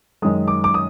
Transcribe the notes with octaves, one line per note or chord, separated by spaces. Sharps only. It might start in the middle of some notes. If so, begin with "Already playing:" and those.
F#2 D#3 G#3 D#6
D6
D6
D#6